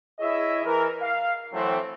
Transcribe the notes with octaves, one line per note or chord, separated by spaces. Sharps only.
E4 G#4 C#5 D#5 E5
E3 A#4
F5
E3 F#3 A3 C4